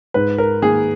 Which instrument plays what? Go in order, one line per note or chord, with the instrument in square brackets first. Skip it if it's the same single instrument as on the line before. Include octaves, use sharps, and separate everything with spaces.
[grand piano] G#2 B4
A#4
D#3 A#3 G#4